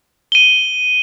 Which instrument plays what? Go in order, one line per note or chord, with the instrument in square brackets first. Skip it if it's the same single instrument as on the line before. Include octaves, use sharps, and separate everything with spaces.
[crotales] D#7 G7